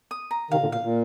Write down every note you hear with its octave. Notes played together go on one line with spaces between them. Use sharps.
D#6
A#5
C3 D#3 F5
A#2 D3
A#2 F5
A#2